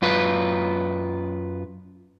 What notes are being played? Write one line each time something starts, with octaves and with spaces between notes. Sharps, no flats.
F#2 F4 B4